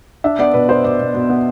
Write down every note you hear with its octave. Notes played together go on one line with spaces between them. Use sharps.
D4 E5
B3 D5
B2 B4
B3 C5
B2 D5
B2
B2
B3